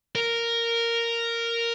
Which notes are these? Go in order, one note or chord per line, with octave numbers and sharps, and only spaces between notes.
A#4